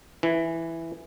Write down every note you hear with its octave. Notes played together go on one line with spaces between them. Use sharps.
E3